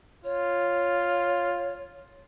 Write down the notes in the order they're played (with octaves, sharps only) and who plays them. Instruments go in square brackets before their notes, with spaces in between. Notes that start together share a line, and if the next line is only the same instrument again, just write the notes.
[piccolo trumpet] F4 [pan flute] C#5